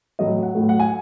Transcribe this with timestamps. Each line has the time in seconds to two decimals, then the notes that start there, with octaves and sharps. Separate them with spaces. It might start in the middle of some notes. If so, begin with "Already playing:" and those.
0.19 A2 F#3 A3 D#5
0.43 F#5
0.55 A2 F#3 A3
0.69 F#5
0.80 G#5